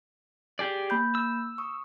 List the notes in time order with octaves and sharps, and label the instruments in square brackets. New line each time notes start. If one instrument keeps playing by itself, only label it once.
[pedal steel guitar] G4 G#4 D5
[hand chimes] A#3 B5 G6
[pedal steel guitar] E6
[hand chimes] C#6 D#6